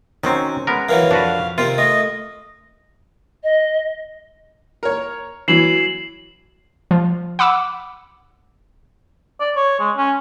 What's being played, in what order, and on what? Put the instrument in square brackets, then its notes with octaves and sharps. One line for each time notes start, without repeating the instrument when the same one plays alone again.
[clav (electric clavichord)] D#3 F#3 C4 [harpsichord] C#4
[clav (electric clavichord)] G#3 B3 A#4
[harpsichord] D#3 E3 F#3 [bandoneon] F5
[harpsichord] F2 [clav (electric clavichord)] D4 F#4 B4
[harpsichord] C3 D#3 C4 [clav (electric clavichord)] F4
[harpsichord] A3 [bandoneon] D#5
[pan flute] D#5
[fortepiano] A#4 C#5
[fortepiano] E3 F#3 [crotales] C7 E7 F#7
[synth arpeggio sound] F3
F#5 B5 D6 E6
[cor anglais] D5
C#5
G#3
C#4